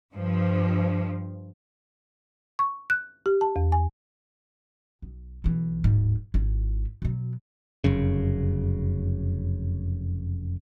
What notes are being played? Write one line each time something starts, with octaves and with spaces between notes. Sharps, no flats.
G2 F3
C#6
F#6
G4
A5
E2
G#5
B1
B1 E3
D1 G#2
G#1 E4
B2 F#3
F1 F#2 C#3